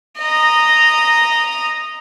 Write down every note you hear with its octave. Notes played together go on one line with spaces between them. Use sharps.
D#5 A#5